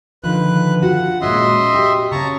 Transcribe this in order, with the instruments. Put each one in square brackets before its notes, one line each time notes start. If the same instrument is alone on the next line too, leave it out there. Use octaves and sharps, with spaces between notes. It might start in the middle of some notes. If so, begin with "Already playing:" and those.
[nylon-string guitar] D3 D#3 F3 [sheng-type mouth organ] B4 F#6
[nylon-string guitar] F4 F#4 [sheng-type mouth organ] F#5
[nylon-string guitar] A#2 G#3 C#4 [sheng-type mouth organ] D#5 E5 C6
[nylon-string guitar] F#4 G4
[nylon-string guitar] C#3 C#5 [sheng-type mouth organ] A5 A#5 C#6